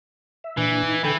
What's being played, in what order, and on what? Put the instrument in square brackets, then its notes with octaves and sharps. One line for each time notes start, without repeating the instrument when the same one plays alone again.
[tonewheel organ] E5
[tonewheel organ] A#2 D4 [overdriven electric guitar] E3
[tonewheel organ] D#4
[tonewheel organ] D3 A4 G5 [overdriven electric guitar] E3